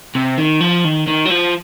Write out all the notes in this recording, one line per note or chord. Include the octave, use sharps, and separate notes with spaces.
C3
D#3
F3
D#3
D#3
F#3
F3